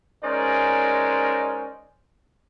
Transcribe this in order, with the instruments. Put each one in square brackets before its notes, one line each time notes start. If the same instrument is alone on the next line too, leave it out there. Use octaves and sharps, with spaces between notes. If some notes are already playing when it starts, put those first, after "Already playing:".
[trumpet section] G#3 C#4 D#4 A#4 C5 D5